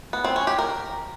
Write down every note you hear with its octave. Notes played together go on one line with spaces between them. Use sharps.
B3
C4
C#4
G4
A#4